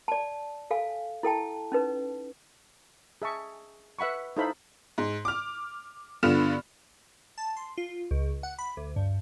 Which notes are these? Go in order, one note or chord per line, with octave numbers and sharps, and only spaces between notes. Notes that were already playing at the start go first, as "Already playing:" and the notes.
D5 A5
A4 F5 G#5
E4 A4 G5 A5
C#4 D#4 B4
G#4 E5 A5 C#6
B4 E5 F#5 B5 C#6
D#4 E4 A4 C5 F5 B5
G#2
D6 F6
G2 D3 B3 F4 F6 E7
A5
C6
F4
C#2
F#5
B5
D2
G2